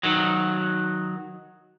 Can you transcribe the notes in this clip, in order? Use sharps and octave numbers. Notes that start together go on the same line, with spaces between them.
D#3 F#3